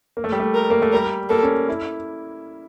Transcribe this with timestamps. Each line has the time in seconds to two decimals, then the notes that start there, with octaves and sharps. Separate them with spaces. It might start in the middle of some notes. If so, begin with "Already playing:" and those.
0.17 A#3
0.24 A3
0.32 G3
0.40 A3
0.54 A#4
0.70 A#3
0.82 A3
0.92 G3 A#4
1.30 A#3 A4
1.43 C#4
1.69 E4